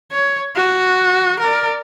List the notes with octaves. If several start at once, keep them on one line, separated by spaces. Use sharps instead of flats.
C#5
F#4
A#4 D5